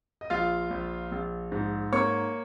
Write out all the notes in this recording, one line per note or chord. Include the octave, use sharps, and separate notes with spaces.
D#5
A#1 F4 F5
A#1
A#1
G#2
A#3 C#5 C#6